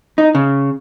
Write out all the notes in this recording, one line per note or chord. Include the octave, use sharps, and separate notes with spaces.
D#4
C#3